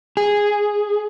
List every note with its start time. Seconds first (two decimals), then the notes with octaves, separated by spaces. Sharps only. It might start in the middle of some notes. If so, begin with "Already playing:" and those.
0.17 G#4